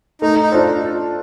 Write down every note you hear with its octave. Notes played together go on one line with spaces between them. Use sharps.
A3 D#4
D#4
D4 F4 A4 C5